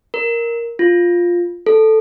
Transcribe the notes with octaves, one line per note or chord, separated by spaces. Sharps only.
A#4
F4
A4